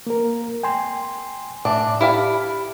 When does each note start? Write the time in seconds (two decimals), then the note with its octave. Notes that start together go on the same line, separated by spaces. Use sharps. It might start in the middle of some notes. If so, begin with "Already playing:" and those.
0.07 A#3 A#4
0.63 G5 G#5 C6
1.65 A2 D4 E5 D6
2.01 E4 G4 F5 B5